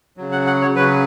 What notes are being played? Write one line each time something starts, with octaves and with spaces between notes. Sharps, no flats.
C#3 F#3
F#5
F#5
C#5
C#3 F#3 B4